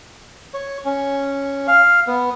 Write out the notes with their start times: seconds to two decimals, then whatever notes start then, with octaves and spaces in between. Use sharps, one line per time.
0.54 C#5
0.85 C#4
1.68 F5
2.07 B3